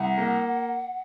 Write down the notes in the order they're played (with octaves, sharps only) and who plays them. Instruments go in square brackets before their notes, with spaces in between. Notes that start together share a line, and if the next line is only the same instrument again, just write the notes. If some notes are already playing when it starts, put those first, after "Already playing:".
Already playing: [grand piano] C2 [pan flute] F#5
[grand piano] A#3